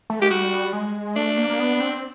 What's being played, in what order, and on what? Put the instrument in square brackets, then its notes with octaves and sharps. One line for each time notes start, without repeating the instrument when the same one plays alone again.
[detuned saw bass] A3
[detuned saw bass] G#3 [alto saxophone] G4
[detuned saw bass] G3 [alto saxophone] F#4
[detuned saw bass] G#3
[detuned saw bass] A3 [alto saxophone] D4
[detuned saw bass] A#3
A#3
B3
C4